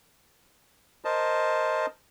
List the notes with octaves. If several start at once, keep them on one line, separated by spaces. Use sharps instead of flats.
A#4 C5 D#5 A5